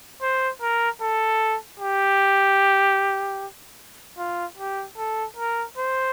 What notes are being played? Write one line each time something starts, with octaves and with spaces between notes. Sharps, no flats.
C5
A#4
A4
G4
F4
G4
A4
A#4
C5